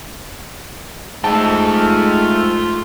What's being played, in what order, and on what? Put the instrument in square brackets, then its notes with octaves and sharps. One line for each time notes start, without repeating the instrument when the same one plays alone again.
[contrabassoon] G#2 [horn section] A3 [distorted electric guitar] F4 G5 [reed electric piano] A5